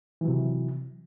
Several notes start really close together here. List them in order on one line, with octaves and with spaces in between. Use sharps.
E3 F#3 C3